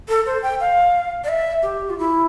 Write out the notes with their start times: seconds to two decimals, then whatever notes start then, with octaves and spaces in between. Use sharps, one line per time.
0.09 A4
0.26 C5
0.43 G5
0.60 F5
1.24 D5
1.29 E5
1.63 G4
1.90 F4
1.99 E4